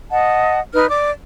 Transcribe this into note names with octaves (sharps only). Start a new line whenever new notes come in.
D#5 F#5 A5
D#4 B4 F6
D5 D6